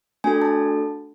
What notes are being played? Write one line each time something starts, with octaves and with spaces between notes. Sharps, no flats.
A3 D4 F#4 A4 G#5
A5